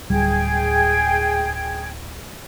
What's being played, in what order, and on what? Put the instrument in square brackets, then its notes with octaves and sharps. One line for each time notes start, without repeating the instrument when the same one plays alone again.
[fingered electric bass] D1 G3 [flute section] G#4 G5 G#6